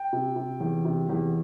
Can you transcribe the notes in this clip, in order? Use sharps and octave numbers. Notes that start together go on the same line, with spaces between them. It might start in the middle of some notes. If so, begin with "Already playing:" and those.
Already playing: G5
C3
C3
E2
C3
E2